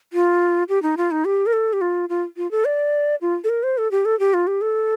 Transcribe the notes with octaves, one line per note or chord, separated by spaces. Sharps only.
F4
G4
D#4
F4
D#4
G4
A#4
A4
G4
F4
F4
F4
A4
D5
F4
A4
A#4
C5
A4
G4
A4
G4
F4
G4
A4